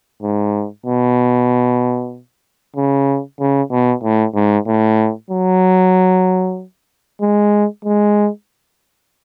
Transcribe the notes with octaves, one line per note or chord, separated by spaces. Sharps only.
G#2
B2
C#3
C#3
B2
A2
G#2
A2
F#3
G#3
G#3